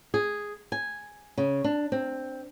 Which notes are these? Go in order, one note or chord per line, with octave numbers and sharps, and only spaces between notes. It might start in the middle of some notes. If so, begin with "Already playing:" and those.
G#4
G#5
C#3
D4
C4